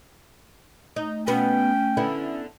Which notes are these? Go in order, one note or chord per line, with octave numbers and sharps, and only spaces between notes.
A3 D#4
B2 B3 C#4 G5
D3 B3 E4